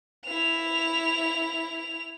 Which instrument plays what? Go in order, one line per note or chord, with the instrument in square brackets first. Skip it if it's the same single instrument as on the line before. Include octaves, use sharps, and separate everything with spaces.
[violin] E4 F7